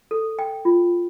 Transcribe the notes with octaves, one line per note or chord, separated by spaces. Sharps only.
A4
G5
F4